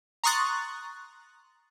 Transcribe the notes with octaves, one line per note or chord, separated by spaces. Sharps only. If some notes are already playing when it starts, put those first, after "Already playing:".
A#5 C6 C#6 D#6 F#6 A6